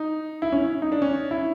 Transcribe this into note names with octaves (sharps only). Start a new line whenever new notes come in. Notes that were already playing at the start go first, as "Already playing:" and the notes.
Already playing: D#4
E4
C#4
D#4
D4
C#4
E4